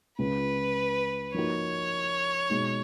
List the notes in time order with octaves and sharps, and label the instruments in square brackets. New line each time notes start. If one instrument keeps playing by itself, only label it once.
[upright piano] C#2 C#3 G#3 C#4 F4 [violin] B4
[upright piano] F3 A#3 D#4 F#4 [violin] C#5
[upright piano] B2 G#3 D#4